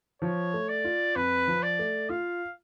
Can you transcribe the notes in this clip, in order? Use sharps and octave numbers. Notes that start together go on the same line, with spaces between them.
F3 C#5
A3
D5
F4
F2 B4
F3
D5
A3
F4 F5